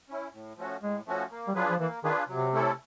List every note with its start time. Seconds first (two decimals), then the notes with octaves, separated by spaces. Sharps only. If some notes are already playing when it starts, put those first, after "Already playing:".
0.09 C#4 E4
0.33 A2
0.57 F3 A3 C#4 F#4
0.82 A2 G#3
1.07 F3 A3 C#4 F#4
1.31 A#3
1.48 G3
1.55 F#3 D4 F4 G#4 B4
1.69 F3
1.79 E3 A#3
2.04 D#3 D4 F4 G#4 B4
2.28 C3 F#3
2.53 A3 C#4 E4 A4